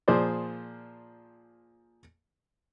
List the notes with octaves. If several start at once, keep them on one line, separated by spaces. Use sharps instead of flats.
A#2 F3 G#4 C5 D5